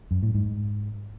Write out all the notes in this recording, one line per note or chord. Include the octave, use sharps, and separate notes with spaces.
F#2
A2
G#2